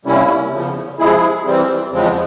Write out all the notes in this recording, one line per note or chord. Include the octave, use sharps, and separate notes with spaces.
C3 G3 A#3 C#4 E4
E2 C#3 F3
C3 F3 G#3 E4 G#4
E3 G3 C4
E2 C#3 F3 G#3 C4